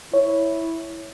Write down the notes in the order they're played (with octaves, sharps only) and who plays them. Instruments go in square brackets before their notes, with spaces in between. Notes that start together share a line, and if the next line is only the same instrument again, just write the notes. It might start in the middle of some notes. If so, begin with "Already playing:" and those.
[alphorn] E4 [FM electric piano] C#5